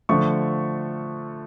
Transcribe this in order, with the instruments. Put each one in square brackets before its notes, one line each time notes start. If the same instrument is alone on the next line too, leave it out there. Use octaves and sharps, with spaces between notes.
[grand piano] D3 F3 A3 C#6